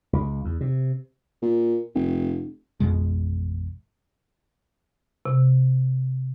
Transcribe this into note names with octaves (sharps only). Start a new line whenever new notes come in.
C#2
E2
C3
A#2
F1
A1 F2 B2 G#3
C3